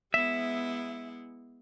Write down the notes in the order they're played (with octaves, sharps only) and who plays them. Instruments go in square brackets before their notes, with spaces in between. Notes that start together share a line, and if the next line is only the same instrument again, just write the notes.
[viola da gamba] G#3 B3 E4 [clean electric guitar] E5